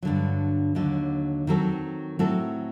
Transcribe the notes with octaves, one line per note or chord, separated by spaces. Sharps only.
G2 D3 F#3
D#2 D3 F#3
D#3 F#3 C4 F#4 A4
A2 F#3 C4 F#4 A4